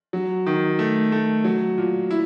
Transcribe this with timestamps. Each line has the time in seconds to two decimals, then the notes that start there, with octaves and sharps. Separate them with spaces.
0.13 F#3
0.46 D#3
0.79 A3
1.12 A3
1.44 F#3
1.78 A#2
2.11 E4